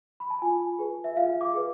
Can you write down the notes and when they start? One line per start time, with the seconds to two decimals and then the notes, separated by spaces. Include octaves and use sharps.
0.20 B5
0.30 A5
0.42 F4 G#5
0.79 G#4 B4
1.04 E5
1.16 F4 F5
1.41 D6
1.54 G#4 B4